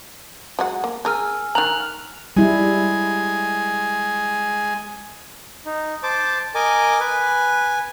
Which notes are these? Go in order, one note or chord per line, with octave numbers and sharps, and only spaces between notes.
F#3 G#3 F#5
A#3
G#4 A#4 G#5 E6 F6
D#3 A#5 F#6 F7 F#7
G3 G#3 E4 G#5
D#4
C5 A5 D6
A#4 D#5 G#5 D6
B4 G#5